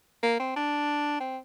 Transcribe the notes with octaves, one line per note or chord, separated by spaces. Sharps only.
A#3
C4
D4
C4